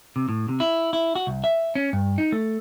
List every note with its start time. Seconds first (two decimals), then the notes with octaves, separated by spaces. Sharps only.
0.16 C3
0.29 A2
0.49 C3
0.60 E4
0.93 E4
1.15 F#4
1.27 C2
1.44 E5
1.75 C#4
1.93 G2
2.18 D#4
2.32 A3